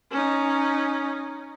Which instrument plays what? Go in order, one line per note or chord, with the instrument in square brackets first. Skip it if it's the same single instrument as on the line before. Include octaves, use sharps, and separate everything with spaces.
[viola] C#4 D#4